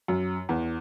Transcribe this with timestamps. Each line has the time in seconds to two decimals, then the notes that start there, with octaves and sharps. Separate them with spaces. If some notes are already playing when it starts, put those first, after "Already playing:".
0.08 F#2
0.49 E2